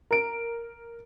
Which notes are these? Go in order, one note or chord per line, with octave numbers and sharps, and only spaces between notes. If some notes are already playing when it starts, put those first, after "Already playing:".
A#4 D7